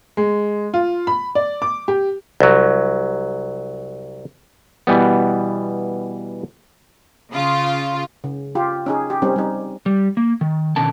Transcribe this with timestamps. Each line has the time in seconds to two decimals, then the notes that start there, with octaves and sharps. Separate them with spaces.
0.17 G#3
0.74 F4
1.07 B5
1.35 D5
1.62 D6
1.88 G4
2.40 C2 F#3
4.87 B2 E3 G3 B3
7.32 C#3 F4
8.24 C#3
8.55 F4 G4
8.86 C#4 D#4 G#4
9.10 G4
9.22 G3 C4 C#4 D#4
9.36 G3 D#4
9.86 G3
10.17 A#3
10.41 D#3
10.76 B2 D3 D#3 C#4 A#4 A5